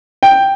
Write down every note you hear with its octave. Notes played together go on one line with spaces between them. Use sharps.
G5